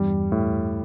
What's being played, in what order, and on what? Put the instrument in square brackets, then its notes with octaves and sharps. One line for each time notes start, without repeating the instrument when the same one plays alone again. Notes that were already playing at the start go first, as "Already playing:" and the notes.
Already playing: [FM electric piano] E2 G2 [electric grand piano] G3
[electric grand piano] A2